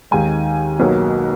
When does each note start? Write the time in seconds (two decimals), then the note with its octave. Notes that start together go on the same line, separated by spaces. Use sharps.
0.11 D#2 D#3 G#3 G#5
0.80 B1 B2 F#3 A#3